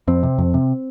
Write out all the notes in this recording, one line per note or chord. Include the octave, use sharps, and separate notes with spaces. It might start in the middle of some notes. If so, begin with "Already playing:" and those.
F2 C4
C3
F2
C3